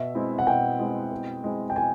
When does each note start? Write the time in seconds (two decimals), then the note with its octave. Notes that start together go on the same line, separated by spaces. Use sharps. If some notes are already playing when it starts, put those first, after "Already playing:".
Already playing: B2 E5
0.15 G#3 C4 E4
0.39 F#5
0.47 B2 G5
0.79 G#3 C4 E4
1.11 B2
1.44 G#3 C4 E4
1.70 G5
1.76 B2 G#5